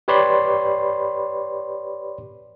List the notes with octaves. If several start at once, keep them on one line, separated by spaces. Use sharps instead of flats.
G4 B4 C#5 D5 B5 C6